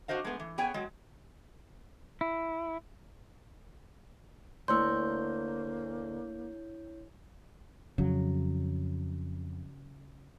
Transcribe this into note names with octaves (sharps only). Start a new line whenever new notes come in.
D4 F#4 C5 D#5 F5
G#3 A3 B3
E3
B3 G#4 C#5 G5 G#5
F#3 G#3
E4
D2 A#3 E4 C#5 C6 E6 G6
F2 C#3 F#3